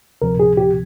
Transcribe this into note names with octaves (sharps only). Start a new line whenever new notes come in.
D2 C3 F3 A#4
G#4
G4